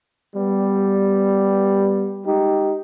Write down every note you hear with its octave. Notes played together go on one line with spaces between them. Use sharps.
G3 B3
G#3 D#4 G4